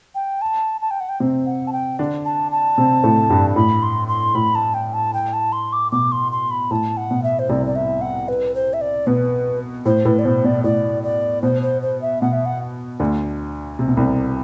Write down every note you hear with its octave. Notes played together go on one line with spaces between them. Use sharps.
G5
A5
A5
G5
F#5
G5
C3 C4
F#5
A5
G5
D3 D4
A5
A5
C3 C4
A2 A3
G2 G3
A2 B5
C6
C6
A2 B5
A5
G5
A5
G5
A5
C6
D6
B2 D6
C6
C6
B5
A2 A5
F#5
B2
E5
C5
C2 C3 D5
D5
E5
F#5
B4
C5
E5
D5
B2 B4
A2 C5
A2 B4
D5
B2 C5
B2 D5
A2 D5
D5
B2 C5
C5
C5
E5
B2 F#5
E5
F#5
D2 D3
C3
B2
C2 C3